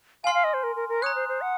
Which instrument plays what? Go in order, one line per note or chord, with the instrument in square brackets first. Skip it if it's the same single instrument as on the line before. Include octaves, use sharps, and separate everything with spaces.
[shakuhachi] F5 [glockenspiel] G#5 C6 F6
[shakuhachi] F5
D#5
C5
A#4
A#4
A#4
[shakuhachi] C#5 [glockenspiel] A#5 D#6 F#6
[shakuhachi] C5
C5
F#5